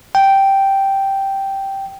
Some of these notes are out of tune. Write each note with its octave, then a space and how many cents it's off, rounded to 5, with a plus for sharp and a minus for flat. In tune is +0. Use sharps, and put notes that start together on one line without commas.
G5 -5